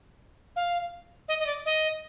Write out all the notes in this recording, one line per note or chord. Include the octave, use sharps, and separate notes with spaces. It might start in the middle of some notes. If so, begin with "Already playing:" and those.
F5
D#5
D#5
D5
D#5